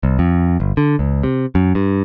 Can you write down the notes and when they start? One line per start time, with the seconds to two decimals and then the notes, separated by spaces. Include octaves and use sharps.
0.03 C2
0.19 F2
0.60 G1
0.77 D3
0.99 C#2
1.23 C3
1.55 F#2
1.75 G2